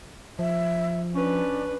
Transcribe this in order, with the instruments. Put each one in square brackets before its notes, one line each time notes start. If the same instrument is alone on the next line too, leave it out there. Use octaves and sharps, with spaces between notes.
[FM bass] F3 [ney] E5
[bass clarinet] C#4 [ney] D4 [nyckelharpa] B4